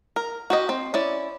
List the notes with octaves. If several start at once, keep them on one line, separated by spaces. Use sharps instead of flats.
A#4
F#4 G4 D#5
C4
C#4 E4 D5